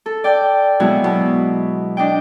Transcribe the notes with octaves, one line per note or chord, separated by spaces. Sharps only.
A4
D5 G5
B2 F#3 G#3 E4 F#4 G#4
B2
D4 D#5 G5